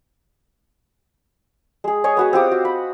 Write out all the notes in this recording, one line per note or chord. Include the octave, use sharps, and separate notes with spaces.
G#3 G#4
G#4 C#5 D#5
B3 F#4 B4
C4 F4 G4 D#6
F#4
B5